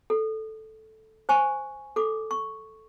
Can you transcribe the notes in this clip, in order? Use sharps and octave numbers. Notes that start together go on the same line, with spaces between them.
A4
C5 G#5 C#6
A4 D6
C#6